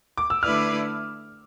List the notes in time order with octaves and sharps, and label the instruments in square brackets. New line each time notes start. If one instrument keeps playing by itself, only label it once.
[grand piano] D6
E6
[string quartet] D3 A3 E4 B4 D5 [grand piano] F6